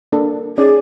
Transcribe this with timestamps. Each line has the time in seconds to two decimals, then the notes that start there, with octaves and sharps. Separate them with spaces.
0.12 A#3 D4 A4
0.58 C#4 D#4 G#4 D5